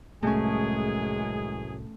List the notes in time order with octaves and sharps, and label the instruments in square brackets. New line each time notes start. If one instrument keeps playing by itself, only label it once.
[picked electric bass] C2 A2 [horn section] F#2 E3 G#4 [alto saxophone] G#3 [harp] A3 C#4